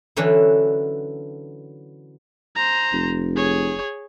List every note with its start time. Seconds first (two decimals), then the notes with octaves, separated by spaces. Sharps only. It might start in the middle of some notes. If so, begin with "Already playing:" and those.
0.16 D3 E3 F#3 C#4 D4
2.56 C5 A#5
2.92 F1
3.36 G#4 C#5